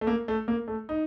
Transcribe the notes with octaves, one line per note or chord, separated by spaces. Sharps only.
A3
A#3
A3
A#3
A3
D#4